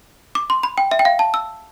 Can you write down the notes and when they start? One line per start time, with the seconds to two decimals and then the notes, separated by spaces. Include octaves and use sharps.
0.35 D6
0.50 C6
0.63 B5
0.78 G5
0.91 E5
0.99 G5
1.05 F5
1.19 A5
1.34 E6